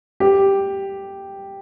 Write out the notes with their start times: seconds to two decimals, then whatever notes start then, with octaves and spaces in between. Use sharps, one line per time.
0.20 G4